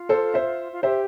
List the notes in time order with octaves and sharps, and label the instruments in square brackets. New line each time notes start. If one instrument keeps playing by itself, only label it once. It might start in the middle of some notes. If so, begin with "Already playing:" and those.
Already playing: [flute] F4
[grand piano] A4 C5
C5 E5
[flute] F4
[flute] G4 [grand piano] C5 E5